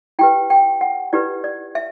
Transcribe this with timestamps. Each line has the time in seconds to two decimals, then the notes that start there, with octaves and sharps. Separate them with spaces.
0.19 E4 G4 B4 G5
0.50 G5
0.81 F#5
1.13 E4 G4 B4 D5
1.44 D5
1.75 E5